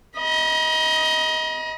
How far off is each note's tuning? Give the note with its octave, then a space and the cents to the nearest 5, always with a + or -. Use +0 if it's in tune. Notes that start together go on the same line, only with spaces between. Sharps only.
D#5 +20 B5 -45